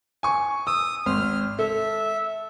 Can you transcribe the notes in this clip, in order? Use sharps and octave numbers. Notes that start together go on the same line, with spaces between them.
G#5 C#6
D#6 E6
G#1 C6 F6
A4 E5